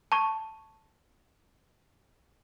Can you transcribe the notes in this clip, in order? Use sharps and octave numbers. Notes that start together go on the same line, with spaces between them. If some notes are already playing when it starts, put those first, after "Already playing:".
A5 C#6